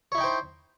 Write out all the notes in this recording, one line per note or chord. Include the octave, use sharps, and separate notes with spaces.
D#4 E4 C5 C#5 G5